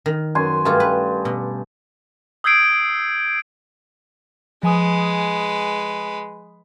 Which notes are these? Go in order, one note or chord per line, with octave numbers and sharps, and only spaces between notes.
D#3
F#2 G#5 C6
G2 A3 F4
B4
B2
D#6 E6 G6 G#6 C7 D7
F3 G#3 B4 G#5 D#6